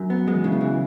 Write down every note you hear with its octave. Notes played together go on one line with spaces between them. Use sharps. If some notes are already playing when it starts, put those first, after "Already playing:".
Already playing: F#2
B3
F#3 G#3
E3
C#3 E4
B3
E3